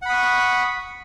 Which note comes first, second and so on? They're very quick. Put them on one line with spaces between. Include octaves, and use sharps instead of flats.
F#5 B5 D#6 C#6